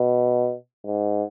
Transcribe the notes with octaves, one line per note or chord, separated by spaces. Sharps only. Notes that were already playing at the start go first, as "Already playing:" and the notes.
Already playing: B2
G#2